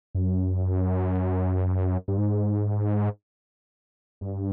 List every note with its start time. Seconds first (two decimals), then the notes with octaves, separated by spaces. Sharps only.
0.15 F#2
2.08 G2
2.18 G#2
4.21 G2